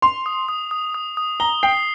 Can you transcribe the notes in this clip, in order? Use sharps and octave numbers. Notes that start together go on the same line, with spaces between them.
C6 F7
D#6
D#6
D#6
D#6
D#6
A#5 G7
G5 C7